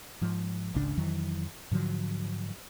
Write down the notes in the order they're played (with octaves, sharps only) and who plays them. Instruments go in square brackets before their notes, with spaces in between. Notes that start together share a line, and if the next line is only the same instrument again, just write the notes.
[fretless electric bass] G#2 F3
G#1 C#2 C#3 D4
F2 D#3 E3 F#3
G#2 D3 F3 F#3